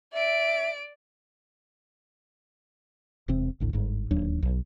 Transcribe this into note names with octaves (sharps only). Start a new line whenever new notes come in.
D5 E5 D7
E1 C3 C4
G#1 D2 A2
G1 G#2
D1 D#2 F#3 D4
B1